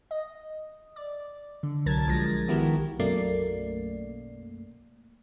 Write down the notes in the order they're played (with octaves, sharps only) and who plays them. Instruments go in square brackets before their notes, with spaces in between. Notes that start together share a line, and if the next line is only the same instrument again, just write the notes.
[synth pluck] D#5
D5
D3
C2 F#3 A#4 A5 G#6 A6
B1 F3 G#3 A#6
D#3 B3 E4 F#4 G4 A#4
[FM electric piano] B1 F#2 A3 A#3 D5 C7